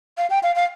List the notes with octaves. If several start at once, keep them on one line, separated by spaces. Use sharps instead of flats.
F5
G5
F5
F5